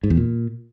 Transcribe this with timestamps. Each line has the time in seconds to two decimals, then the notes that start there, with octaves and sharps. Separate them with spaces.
0.03 G#2
0.10 E2
0.17 A#2